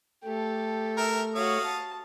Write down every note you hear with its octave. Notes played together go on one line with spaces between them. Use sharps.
A3 G4 A4
A#4 E5
F#4 C#5 F5 D#6
A5